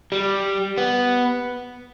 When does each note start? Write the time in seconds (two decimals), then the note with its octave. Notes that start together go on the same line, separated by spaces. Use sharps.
0.12 G3
0.78 B3